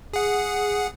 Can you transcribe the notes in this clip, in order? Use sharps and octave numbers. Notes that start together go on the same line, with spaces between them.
G#4 F#5